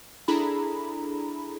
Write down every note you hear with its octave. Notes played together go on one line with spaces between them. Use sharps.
D4 E4 G#4 A4 A#5 B5